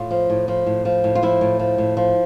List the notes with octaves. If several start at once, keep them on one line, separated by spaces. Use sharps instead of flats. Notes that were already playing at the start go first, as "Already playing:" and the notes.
Already playing: A2 F4
F3
A2
F3
A2
F3
A2
F4
F3 E4
A2
F3
A2
F3